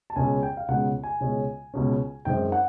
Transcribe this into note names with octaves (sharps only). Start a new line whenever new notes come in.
A5
C#2 B2 G#3 C#4 G#5
G5
F5
C#2 B2 G#3 C#4 F#5
G#5
C#2 B2 G#3 C#4
C#2 B2 G#3 C#4
F#2 D#3 G#3 C4 G5
F#5